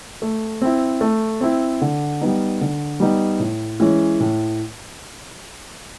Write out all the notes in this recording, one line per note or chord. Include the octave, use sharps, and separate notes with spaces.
A3
C4 E4
A3
C4 E4
D3
G3 B3 D#4
D3
G3 B3 D#4
A2
E3 G#3 C#4
A2